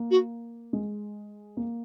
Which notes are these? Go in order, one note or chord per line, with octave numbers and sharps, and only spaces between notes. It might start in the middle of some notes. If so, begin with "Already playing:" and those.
Already playing: A#3
F#4
G#3
A#3